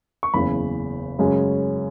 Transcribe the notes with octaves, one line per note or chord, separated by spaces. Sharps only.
C#6
F#1 E2 C#3 B5
F#2 C#3 G#3 C#4